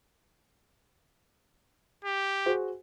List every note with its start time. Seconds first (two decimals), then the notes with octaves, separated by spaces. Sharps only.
2.05 G4
2.46 F#4 G#4 C5